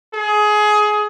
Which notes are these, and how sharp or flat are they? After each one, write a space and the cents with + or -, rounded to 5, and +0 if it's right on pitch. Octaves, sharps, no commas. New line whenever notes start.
G#4 +20